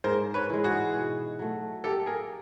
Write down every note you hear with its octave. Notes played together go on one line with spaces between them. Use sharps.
G#2 A#4 C5
B4 C#5
E3 G#3
F#4 G#4
B2
F#3 A3
A#3 G4 A4
G#4 A#4